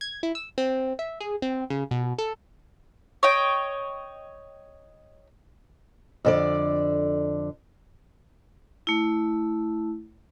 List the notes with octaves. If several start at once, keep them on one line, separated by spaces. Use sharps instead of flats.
G#6
E4
E6
C4
E5
G#4
C4
C#3
B2
A4
C#5 D#5 G5
F2 D3 D5
A3 E4